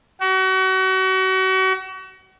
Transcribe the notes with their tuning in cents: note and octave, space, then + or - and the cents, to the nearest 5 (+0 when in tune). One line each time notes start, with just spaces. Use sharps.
F#4 +35